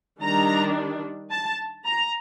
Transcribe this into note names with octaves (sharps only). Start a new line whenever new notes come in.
D#3 G3 D4 A#5
A5
A#5